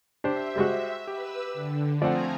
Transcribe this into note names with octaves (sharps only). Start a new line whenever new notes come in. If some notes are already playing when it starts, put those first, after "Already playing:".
D4 G4 C5 E5
G3 G#3 F#4
G4 B4 E6
D3
F3 A3 C4 D5 F#5 G#5 A#5